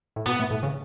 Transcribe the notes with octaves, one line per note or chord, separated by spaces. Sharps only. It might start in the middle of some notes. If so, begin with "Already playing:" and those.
A2
B2 B3
A2
A2
C#3